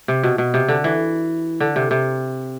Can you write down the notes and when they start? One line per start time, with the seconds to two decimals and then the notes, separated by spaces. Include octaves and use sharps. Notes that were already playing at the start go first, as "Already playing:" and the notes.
0.08 C3
0.23 B2
0.38 B2
0.54 C3
0.68 D3
0.84 E3
1.60 D3
1.76 C3
1.91 C3